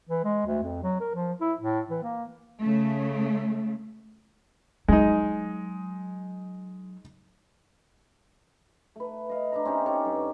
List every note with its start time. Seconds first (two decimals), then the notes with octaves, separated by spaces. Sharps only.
0.09 E3
0.24 G#3
0.46 D2
0.63 F2
0.83 F#3
1.00 A#4
1.15 F3
1.41 E4
1.61 A2
1.90 E3
2.03 A#3
2.61 C#3 A3
4.88 F#3 G#3 D#4
8.96 A3 B4
9.29 D#5 F5
9.52 D4 E5 A#5
9.65 C4 C#4 D#4 G4
9.86 C#4 G4 A4 C#5
10.05 G2